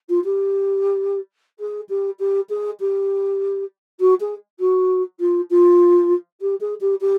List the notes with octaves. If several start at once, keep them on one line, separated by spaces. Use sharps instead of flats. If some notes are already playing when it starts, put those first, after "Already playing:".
F4
G4
G#4
G4
G4
G#4
G4
F#4
G#4
F#4
F4
F4
G4
G#4
G4
G4